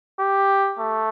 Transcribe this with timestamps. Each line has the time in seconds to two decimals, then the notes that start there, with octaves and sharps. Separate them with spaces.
0.20 G4
0.79 A3